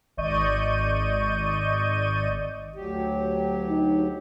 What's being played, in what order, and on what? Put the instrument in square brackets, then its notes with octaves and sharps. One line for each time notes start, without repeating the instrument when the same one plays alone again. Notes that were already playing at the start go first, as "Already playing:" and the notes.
[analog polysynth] G#1 D5 D#5 C#6 G6 D#7
[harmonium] D2 F#3 G4
[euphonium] D#4